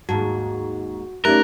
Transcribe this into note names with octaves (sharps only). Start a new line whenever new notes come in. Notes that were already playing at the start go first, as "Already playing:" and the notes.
D#2 G#2 F#4 A5
A3 C#4 D#4 G4 A#4 C#5 D5 F#6